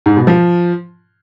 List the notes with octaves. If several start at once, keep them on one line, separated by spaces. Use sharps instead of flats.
G#2
B2
F3